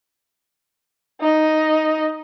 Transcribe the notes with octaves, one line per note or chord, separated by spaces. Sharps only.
D#4 D#5